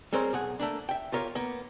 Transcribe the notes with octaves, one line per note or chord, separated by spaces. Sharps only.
G3 G#3 C4 A#4 C5 C#5
B1 G#4 F#5
A3 A#3 D4
E5 G5
F4 G4 A#4 C#5 F5
A#3 B3